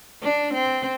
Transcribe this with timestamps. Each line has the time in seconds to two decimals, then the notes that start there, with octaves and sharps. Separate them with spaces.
0.23 D4
0.54 C4